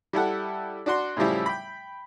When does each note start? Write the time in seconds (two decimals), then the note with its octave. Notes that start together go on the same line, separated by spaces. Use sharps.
0.13 G3 E4 A4 F#5
0.86 D4 F#4 C6
1.17 A2 C#3 F3 G3 E4
1.46 G5 B5